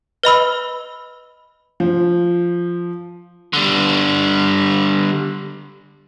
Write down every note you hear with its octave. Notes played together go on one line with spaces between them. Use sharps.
B4 D#5 B5 E6
F3
D3 G3